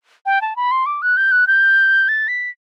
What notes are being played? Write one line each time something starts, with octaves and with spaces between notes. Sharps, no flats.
G5
A5
B5
C6
D6
F#6
G6
F#6
G6
A6
B6